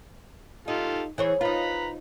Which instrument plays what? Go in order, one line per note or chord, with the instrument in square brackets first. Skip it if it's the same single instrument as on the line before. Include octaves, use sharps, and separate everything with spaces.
[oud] D#4 [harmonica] F4 G4 A4
[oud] E3 C5 C#5 [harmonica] G#4
[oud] D#4 F4 [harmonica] B4 A#5 B5